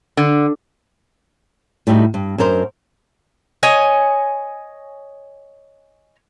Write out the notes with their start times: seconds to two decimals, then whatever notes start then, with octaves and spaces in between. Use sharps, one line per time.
0.17 D3
1.87 A2 G3 D#4 E4 F#4
2.14 G2
2.38 F#2 D4 A#4 C5
3.63 C#5 D#5 G#5